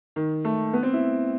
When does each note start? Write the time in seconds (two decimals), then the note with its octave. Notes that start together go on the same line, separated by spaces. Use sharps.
0.16 D#3
0.45 A3
0.73 B3
0.83 C4
0.93 E4